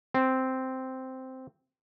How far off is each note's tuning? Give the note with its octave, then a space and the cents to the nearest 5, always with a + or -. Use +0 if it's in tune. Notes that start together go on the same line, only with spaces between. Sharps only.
C4 -5